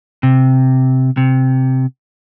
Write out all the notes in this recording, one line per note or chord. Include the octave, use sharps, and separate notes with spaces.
C3
C3